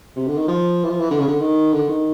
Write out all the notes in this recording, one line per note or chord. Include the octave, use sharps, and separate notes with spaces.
C3
D3
D#3
F3
E3
F3
E3
D3
C#3
D3
D#3
D3
D#3